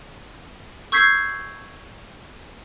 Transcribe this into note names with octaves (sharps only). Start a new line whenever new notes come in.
C#6 E6 G6 G#6 B6 C7